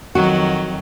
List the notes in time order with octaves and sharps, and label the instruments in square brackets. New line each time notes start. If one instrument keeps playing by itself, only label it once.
[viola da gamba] F2 D#3 F#3 [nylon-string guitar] F#4